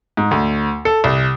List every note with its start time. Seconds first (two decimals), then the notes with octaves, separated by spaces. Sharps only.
0.17 G#2
0.31 D2
0.85 A4
1.04 C2